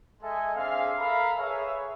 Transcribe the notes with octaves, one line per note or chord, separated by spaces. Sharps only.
G#3 A4 D#5 E5 G#5
C4 D4 G#4 E5 F5
A4 A#4 E5 F5 A#5 B5
G#4 B4 C#5 E5